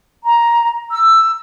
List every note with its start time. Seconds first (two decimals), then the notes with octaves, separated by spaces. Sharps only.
0.23 A#5
0.91 E6